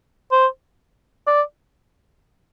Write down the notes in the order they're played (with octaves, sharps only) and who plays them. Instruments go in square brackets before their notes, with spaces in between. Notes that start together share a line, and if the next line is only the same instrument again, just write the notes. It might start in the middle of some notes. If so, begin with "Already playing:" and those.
[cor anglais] C5
D5